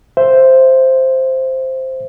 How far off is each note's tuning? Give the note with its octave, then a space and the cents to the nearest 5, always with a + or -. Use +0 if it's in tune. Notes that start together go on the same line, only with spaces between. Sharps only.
C5 +0 E5 +15